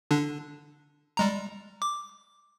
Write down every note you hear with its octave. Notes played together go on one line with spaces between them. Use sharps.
D3 D4
G3 G#3 A#5
D6